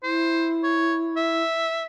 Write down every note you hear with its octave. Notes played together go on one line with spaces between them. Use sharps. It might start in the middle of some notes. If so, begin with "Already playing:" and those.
E4 C5
C#5
E5